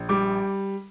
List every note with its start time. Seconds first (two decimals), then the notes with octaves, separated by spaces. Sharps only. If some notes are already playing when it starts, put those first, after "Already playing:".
Already playing: A#1
0.09 G3 D6